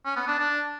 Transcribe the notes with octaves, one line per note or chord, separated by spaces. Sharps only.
C#4
B3
D4
D4